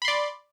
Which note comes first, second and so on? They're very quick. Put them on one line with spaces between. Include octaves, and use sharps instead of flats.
B5 C6 D5